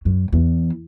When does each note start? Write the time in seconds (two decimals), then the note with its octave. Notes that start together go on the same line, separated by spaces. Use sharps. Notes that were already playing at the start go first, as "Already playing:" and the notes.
0.05 F#2
0.32 E2